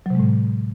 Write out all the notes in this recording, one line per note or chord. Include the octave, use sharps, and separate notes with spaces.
A2 C3 F#3 G#3